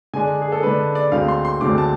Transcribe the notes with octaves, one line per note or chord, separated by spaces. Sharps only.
D3 G#3 D4 G#5
G#4
A4
D3 G#3 D4 B4
D5
D2 D3 G#3 C4 F5
C6
C6
D2 D3 G#3 C4 D6
A5